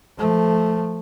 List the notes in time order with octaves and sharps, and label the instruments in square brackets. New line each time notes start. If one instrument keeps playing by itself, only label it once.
[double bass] F3 A3